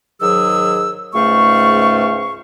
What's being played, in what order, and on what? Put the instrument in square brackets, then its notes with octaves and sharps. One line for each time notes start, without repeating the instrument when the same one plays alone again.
[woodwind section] G#2 D#3 F#3 G#4 E6
C#2 G#2 A3 F5 C#6